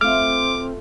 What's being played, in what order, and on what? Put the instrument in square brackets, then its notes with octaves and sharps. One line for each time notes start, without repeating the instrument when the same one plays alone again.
[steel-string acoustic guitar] A3 F4 [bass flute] C4 [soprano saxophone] D6 [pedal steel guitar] F6